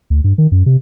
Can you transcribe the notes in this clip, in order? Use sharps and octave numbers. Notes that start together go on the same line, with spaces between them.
D2
G2
D#3
F#2
C3